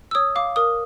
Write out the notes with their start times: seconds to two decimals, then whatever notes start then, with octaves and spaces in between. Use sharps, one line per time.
0.11 E6
0.15 C#5 D#6
0.36 F5 D6
0.56 A#4 D#6